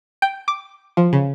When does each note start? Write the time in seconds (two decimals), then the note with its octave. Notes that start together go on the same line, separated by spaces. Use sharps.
0.22 G5
0.48 D6
0.97 F3
1.13 C#3